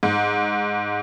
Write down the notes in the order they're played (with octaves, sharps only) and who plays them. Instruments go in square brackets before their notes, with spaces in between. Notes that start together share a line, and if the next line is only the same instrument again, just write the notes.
[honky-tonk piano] G#2